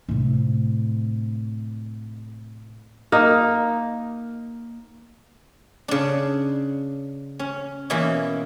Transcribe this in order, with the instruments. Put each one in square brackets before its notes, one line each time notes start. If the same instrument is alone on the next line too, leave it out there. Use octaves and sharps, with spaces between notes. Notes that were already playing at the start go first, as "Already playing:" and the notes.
[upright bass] A2 C3
[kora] A#3 D#4
[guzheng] C#3 D4
C#4
B2 E3 A#3 C#4 D#4